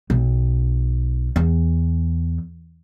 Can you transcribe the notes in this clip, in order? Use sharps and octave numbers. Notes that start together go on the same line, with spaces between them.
B1
E2